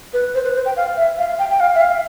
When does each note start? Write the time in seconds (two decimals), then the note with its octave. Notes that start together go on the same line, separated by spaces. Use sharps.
0.14 B4
0.35 C5
0.44 B4
0.55 C5
0.66 G5
0.77 F5
0.97 E5
1.18 F5
1.39 G5
1.50 G5
1.60 F5
1.75 E5
1.81 F5